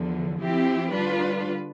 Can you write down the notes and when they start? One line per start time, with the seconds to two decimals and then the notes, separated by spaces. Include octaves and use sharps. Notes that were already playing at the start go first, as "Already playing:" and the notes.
Already playing: E2 D3 F3
0.41 F3 C4 E4 G4
0.93 D3 G3 D4 F4 B4